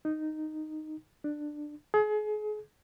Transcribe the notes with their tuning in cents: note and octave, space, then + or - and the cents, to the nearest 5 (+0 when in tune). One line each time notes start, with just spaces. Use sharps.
D#4 -5
D4 +15
G#4 +35